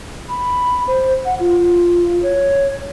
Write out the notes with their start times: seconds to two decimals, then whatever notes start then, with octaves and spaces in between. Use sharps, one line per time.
0.29 B5
0.87 C5
1.25 F#5
1.40 F4
2.23 C#5